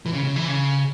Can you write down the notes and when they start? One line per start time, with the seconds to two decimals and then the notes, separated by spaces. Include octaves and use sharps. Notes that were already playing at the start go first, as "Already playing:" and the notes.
0.06 E3
0.13 C#3
0.25 C#3
0.36 E3
0.48 C#3